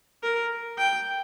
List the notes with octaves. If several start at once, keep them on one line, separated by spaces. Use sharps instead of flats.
A#4
G5